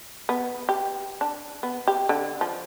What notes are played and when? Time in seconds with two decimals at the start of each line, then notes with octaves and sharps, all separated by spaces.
0.29 B3
0.69 G4
1.21 D4
1.63 B3
1.87 G4
2.09 D3
2.41 F3